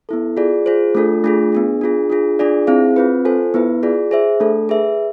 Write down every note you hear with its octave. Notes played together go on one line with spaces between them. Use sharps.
B3 E4 A4
F4 G#4 D5
F4 G#4 C5
A3 D4 F4 A4
A3 D4 F4 G#4
B3 D4 G#4
D4 F4 G#4
D4 F4 G#4
D4 F4 G#4 D5
C4 E4 G#4 C5 F5
C4 F4 B4
F4 A4 C5 G#5
B3 E4 B4
F4 G#4 D5
G#4 C5 E5
A3 D4 A4
G#4 B4 E5